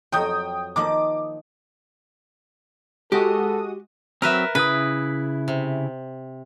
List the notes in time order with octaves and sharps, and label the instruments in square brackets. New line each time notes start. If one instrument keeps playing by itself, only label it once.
[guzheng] F2 F#3 [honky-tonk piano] G5 D#6 G6
[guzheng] D#3 F3 A#3 [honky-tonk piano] D6
[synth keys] G#3 F#4 D#6 [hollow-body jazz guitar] G4 [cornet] A4
[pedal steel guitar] F#3 C4 [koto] A#4 B4 E5
[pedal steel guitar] C#3 E4 D#6 [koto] B4
[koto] C3